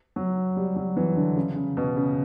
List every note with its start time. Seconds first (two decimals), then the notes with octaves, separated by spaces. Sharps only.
0.16 F#3
0.56 G3
0.76 F#3
0.97 E3
1.16 D3
1.36 C#3
1.56 C#3
1.77 B2
1.96 C#3